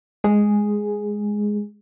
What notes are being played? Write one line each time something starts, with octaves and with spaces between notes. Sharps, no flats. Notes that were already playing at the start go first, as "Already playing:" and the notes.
G#3 G#4